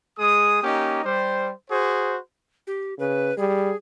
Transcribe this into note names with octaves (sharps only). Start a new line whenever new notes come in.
G#3 G#4 D#6
A#3 C#4 D#4 G4
G3 C5
F#4 G#4 C5
G4
C#3 B4
G3 G#4